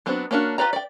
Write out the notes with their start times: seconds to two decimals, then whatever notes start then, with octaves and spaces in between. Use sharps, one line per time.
0.06 F#3 B3 C4 D4 F#4
0.31 A#3 C#4 D4 F4 F#4
0.58 F4 G4 B4 D5 A#5
0.73 D5 G5